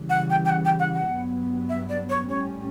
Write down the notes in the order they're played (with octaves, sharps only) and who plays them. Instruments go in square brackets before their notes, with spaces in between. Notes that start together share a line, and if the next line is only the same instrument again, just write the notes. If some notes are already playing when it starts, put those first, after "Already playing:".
Already playing: [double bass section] C#3 E3 G3
[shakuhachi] F#5
G5
G5
F#5
G5
F#5
F#5
[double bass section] G2 F#3 B3
[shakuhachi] E5
D5
C#5
[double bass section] A2 G3 C#4 [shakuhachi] C#5